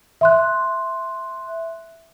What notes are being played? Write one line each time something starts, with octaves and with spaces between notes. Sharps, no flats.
E5 C6 F#6